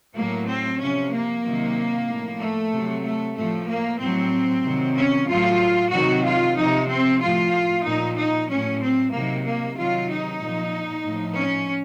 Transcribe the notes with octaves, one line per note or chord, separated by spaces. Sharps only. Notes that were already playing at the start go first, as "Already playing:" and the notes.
A2 F#3 A#3
C4
C3 F3 C#4
A#3
C3 D#3 F#3
A2 F3
A3
C3 F#3
A3
A2 F3 A3
A#3
A2 F#3 C4
C3 D#3 F#3
C#4
A2 F#3 F4
C3 D#3 F#3 F#4
F4
C3 F3 D#4
C4
A2 F3 F4
A#2 F3 D#4
D#4
A2 F#3 C#4
C4
C3 D#3 F#3 A#3
A#3
C3 D#3 F#3 F4
D#4
A#2 F3
A2 F3
C#4